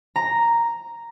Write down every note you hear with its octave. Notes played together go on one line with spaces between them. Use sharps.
A#5